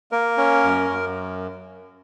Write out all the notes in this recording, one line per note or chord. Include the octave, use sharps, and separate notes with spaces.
A#3 A#4
C#4
F#2
F#2